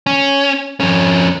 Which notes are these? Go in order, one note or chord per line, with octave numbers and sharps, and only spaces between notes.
C#4
F2 C#4